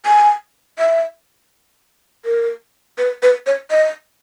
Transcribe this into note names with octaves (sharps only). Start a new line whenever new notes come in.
G#5
E5
A#4
B4
B4
C#5
D#5